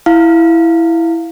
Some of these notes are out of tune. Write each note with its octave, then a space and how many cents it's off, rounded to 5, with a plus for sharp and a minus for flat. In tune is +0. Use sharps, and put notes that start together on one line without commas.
E4 +0 F5 +0